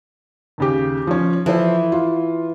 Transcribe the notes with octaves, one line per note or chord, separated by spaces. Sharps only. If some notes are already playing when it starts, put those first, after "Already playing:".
D#2 C#3 G4
F3 C#4
E3 F3 A4 C5
F4